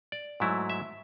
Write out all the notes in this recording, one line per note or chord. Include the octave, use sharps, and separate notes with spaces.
D5
G#2 F#3 A3 E4
E5